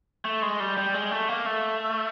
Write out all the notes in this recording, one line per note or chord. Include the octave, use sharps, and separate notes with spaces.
A3
G#3
G3
G3
G#3
A3
A#3
A3